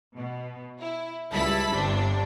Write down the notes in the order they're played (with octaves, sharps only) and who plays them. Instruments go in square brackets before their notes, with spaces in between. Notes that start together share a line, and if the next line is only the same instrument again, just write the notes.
[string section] B2
E4
C#2 G3 E4 A5 B5 B6
G1 G2 C3 D4